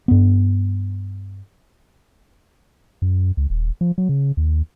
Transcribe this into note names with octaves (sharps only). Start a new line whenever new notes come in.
G2 B3
F#2
C#2
D#1
F3
F#3
C#3
D#2